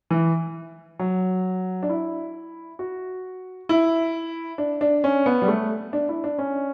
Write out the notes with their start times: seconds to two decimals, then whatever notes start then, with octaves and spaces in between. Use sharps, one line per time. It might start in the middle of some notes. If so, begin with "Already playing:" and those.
0.11 E3
0.99 F#3
1.83 D4
1.89 E4
2.79 F#4
3.69 E4
4.58 D4
4.81 D4
5.04 C#4
5.26 B3
5.42 G3
5.48 A3
5.93 D4
6.09 E4
6.24 D4
6.39 C#4